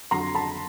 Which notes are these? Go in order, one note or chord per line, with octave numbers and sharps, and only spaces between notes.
F2 D3 F#3 A#5 C6
A5 B5